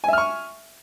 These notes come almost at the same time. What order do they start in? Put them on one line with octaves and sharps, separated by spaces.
G#5 E5 F6 C#6